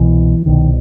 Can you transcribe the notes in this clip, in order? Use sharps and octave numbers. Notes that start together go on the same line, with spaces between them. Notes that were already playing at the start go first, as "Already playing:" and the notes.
Already playing: C2 B2 E3
C2 B2 D#3